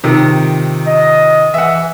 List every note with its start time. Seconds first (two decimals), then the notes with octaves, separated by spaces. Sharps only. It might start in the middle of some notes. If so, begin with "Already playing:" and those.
0.03 C3 D#3 F3
0.87 D#5
1.54 E3 E5 F#5